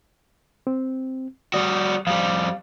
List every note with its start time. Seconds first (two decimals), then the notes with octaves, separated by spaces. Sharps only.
0.67 C4
1.54 G3 F#4 D5 D#6
2.07 F2 G3 F5